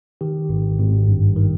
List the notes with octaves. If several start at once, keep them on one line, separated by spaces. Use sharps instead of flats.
D#3 G4
G#1
G#1
G2
D#3